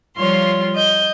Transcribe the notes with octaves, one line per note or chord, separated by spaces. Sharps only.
F3 G3 F4 C#5 C6
D#5 G6